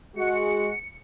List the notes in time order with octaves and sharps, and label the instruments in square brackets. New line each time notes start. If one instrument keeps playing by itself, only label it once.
[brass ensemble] G#3 F#4 [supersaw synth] C#7